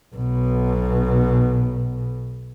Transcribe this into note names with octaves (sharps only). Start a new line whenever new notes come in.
B1 B2